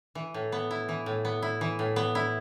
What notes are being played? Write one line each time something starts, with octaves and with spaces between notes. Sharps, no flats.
E3
A2
B3
E4
E3
A2
B3
E4
E3
A2
B3
E4